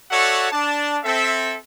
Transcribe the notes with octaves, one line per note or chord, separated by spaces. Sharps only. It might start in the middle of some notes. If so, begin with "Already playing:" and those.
F#4 A4 C#5 D5 E5 F#5
D4 A5
C4 A4 E5